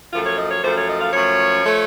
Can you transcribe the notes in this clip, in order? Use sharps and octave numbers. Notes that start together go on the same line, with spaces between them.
F#2 F3 A3 F4
C#5
D#5
C#5
F#2 F3 A3 C5
C#5
D#5
F5
F#2 F3 A3 C#5
F3 A3